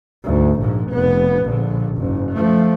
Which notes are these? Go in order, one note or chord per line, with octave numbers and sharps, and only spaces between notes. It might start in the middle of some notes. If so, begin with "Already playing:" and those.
D2 G#2
A#1 G#2
F1 B3
A#1 D3
F#1 G#2
F3 A3